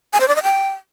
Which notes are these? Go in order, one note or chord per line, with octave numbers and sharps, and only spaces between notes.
G#5
C5
D5
D#5
G5